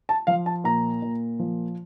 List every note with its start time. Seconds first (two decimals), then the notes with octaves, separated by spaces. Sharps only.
0.09 A5
0.27 F3 F5
0.46 A5
0.64 A#2 A#5
1.02 A#2
1.39 F3